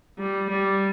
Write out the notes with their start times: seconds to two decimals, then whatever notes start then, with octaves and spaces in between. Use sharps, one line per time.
0.19 G3
0.50 G3